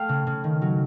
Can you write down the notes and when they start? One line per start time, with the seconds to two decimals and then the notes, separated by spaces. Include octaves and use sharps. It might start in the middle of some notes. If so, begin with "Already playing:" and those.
Already playing: A3 F5 G5
0.09 C#3
0.27 C#3
0.44 D#3
0.62 F#3